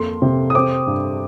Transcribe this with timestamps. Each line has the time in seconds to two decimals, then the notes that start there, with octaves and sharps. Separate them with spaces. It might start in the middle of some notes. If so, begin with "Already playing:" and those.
Already playing: F2 A#3 C6
0.22 C3
0.50 D#6
0.55 C4 D6
0.87 G2